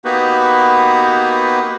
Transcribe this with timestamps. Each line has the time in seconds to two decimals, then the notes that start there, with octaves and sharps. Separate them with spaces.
0.05 A#3 B3 D#4 F#4 G4 B4